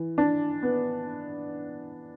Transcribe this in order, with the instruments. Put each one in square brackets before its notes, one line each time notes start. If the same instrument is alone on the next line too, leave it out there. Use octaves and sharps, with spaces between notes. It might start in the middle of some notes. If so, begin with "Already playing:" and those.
Already playing: [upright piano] E3
D4
B3